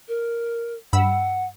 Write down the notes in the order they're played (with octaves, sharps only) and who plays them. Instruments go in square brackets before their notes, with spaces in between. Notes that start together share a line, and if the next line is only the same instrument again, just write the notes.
[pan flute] A#4
[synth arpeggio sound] G2 B5 E6 [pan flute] F#5